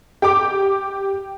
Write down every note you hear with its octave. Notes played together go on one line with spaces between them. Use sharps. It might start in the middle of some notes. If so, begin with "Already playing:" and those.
G4 G5 D6